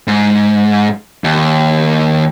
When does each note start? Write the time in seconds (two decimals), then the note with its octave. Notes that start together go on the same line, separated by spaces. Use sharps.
0.08 G#2
1.24 D#2